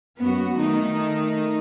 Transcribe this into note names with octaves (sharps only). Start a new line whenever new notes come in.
F#2 B3 F#4
D#3 A3 D#4